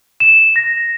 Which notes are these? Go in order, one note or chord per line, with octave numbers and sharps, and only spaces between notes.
E7
A#6